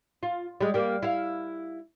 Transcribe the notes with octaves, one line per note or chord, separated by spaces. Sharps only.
F4
G3 G#3
G3 A#3
E4 F5